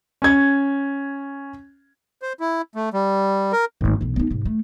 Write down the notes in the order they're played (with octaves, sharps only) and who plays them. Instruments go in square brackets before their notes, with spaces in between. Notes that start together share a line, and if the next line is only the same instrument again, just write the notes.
[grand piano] C#4 G#6
[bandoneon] C5
E4
A3
G3
A#4
[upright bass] G#1 A#3
B1 E3
B3 D#4
G#2 C3
A3